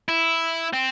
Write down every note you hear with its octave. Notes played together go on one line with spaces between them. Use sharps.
E4
C4